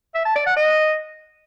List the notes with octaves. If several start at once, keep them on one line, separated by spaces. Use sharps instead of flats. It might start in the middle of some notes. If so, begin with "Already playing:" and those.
E5
A5
D5
F#5
D#5